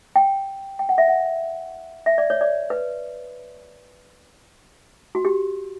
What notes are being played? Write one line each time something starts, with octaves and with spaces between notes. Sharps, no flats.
G5
G5
F#5
E5
F#5
E5
D5
C#5
D5
B4
F#4
G4